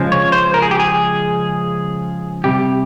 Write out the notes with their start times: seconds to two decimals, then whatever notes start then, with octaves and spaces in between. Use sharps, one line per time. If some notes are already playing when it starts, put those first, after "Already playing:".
Already playing: C#3 F3 G#3
0.12 C#5
0.32 C5
0.54 A#4
0.62 G#4
0.71 G4
0.79 G#4
2.44 C3 G3 G4